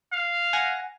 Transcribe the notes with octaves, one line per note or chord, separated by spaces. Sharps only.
F5
F#5 G#5 A#6